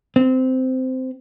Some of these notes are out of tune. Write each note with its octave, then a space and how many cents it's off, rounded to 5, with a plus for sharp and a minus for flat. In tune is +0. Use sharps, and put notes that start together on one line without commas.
C4 -15